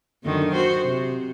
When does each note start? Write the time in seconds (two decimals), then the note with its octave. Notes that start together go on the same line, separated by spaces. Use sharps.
0.23 F#2 D3 D#3
0.53 F#4 C5
0.84 C3